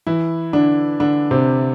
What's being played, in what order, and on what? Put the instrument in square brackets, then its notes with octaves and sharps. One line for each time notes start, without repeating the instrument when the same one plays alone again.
[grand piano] E3 E4
D3 D4
D3 D4
C3 C4